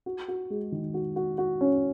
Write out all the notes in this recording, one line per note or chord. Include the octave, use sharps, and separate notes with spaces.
F#4
F#4
G#3
D#3
F#4
F#4
F#4
C#4